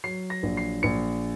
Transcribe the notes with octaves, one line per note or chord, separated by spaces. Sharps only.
F#3 C7
A#6
A#1
C7
A#1 C#7